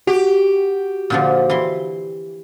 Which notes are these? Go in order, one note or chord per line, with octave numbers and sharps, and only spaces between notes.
F#4 G4
A#2 D3 F3
E3 C6